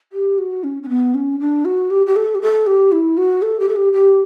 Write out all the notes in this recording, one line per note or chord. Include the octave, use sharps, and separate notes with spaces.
G4
F#4
C#4
C#4
B3
C#4
D4
F#4
G4
G4
A4
G4
A4
G4
E4
F#4
A4
G4
A4
G4
G4